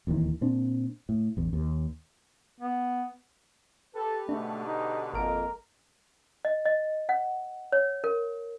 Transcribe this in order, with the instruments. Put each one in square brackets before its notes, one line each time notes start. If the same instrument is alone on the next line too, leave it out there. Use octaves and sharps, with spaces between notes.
[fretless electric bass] D1 D#2 D#3 E3
A#2 C4 D4
A2
A1 E2
D#2
[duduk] B3
[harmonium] G4 B4 [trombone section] A4
[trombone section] G#2 B2 D3 [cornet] A3 [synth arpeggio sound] D4
[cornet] D#4
[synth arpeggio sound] G#1 F6 D7 [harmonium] F2 G#3 A#3 [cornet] A#4
[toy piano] D#5
D#5
F#5
C#5
A#4